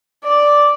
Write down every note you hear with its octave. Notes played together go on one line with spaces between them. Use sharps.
D5